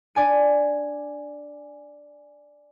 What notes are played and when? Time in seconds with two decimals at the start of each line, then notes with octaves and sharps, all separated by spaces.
0.15 D4 D5 G#5 D#7